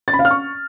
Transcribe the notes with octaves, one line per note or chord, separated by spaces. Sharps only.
A6
B5
F5
F6
C#6